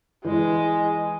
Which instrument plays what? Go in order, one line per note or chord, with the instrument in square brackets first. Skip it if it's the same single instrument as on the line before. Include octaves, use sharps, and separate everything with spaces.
[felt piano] E3 [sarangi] G#3